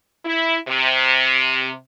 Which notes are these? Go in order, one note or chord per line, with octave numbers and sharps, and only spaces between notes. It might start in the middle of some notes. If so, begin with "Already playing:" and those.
E4
C3